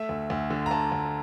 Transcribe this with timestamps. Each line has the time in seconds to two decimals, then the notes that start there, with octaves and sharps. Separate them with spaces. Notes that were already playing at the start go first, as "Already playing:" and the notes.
Already playing: A3 E5
0.09 D2
0.30 D2
0.50 D3
0.66 A#5
0.71 D2 A5
0.92 D2